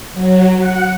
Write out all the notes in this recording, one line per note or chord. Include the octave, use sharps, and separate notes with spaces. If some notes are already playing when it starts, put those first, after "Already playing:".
F#3
F#5